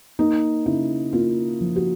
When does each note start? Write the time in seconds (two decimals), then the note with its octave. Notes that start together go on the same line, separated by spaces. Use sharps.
0.19 A#3 D#4
0.66 C#3 E4
1.13 A#3 F4
1.61 F3
1.76 F#4